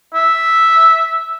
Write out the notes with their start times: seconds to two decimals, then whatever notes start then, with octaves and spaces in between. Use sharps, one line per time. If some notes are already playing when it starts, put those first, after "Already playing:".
0.14 E5